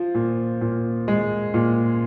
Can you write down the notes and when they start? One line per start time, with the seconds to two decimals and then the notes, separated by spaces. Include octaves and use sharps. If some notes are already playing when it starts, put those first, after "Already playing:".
Already playing: F3
0.15 A#2
0.61 A#2
1.08 G#3
1.54 A#2